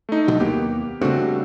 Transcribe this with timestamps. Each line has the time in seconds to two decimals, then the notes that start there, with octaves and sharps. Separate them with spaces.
0.09 A3 D#4
0.28 D2 B2 F#3
0.40 D#2 A#3 B3 G4
1.01 G2 C#3 A3 C4 F#4